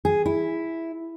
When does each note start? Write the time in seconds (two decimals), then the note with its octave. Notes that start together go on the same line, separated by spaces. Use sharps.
0.05 G#4
0.26 E4